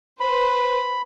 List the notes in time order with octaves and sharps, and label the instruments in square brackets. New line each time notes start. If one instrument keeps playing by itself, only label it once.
[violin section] B4 C5 [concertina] B5